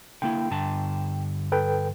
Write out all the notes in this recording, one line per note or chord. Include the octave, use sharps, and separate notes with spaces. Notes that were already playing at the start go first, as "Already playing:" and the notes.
D3 A#3 E4 G5
G2 D3 A5
A4 B4 G5